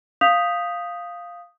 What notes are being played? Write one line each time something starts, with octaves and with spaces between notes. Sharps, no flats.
F5 D#6 G6 B6 F7